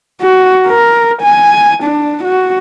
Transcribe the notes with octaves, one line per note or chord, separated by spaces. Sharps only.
F#4
A#4
G#5
D4
F#4